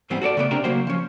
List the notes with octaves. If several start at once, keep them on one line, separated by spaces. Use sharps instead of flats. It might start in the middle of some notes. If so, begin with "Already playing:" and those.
G#2 E3 G3 B3 C4
F#4 A4 C#5 D5
C#3 A3 B3 D5
C3 C4 D4 G4 A#4
C#3 F#3 A#3 F#4 C5
F3 C#4